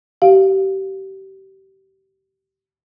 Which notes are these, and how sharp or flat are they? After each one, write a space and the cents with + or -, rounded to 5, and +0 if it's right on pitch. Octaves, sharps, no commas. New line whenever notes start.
G4 -30 F5 -5